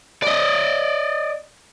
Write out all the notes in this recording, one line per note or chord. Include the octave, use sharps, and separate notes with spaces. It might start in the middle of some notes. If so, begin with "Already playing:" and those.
D5 D#5